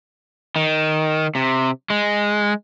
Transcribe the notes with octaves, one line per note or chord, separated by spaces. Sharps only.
D#3
C3
G#3